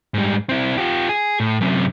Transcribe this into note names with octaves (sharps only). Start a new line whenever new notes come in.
G#2 G3
C4 E4
F4 G4
G#4
A2
F#2 C3